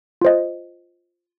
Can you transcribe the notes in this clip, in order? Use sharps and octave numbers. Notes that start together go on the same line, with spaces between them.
F4 C5 D#5